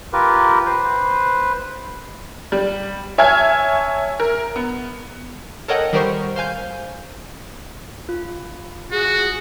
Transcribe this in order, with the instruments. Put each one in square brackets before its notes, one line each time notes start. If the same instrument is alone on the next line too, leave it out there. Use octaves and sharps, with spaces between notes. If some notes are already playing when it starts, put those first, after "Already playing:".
[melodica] F4 G4 A#4 B4
B4 C5
[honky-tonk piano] G3
C#5 E5 G#5 A5 F6 G#6
A#4
B3
[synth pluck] A4 A#4 C#5 D#5 F#5 G5
D#3 G3 G4 A#4 C5 C#6
C5 F5 G#5 G6
[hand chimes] F4
[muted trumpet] F#4 [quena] G#4